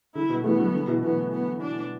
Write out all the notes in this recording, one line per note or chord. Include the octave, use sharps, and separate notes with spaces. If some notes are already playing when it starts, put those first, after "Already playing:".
D3 E4
B2
E3 A3 B3
E3
D3 F#3
D3
B2 E3
B2 E3 B3
B3
D4